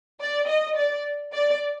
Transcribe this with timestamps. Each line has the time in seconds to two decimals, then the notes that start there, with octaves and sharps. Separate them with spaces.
0.20 D5
0.48 D#5
0.76 D5
1.33 D5